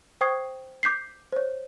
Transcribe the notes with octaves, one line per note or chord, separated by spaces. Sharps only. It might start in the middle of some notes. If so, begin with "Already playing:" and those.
C5 G5 C#6 D#6 G#6 C7
D6 G6 B6 C7
C5 C#5